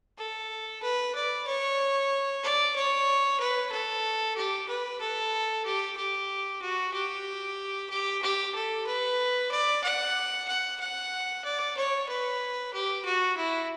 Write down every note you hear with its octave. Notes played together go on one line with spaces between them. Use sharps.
A4
B4
D5
C#5
D5
C#5
B4
A4
G4
B4
A4
G4
G4
F#4
G4
G4
G4
A4
B4
D5
F#5
F#5
F#5
D5
C#5
B4
G4
F#4
E4